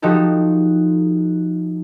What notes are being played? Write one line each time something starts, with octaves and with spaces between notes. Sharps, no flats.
F3 D#4 F#4 G4 A4